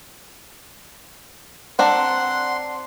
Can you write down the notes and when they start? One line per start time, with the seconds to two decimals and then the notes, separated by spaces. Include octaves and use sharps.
1.79 C4 D4 F#5 A#5 C6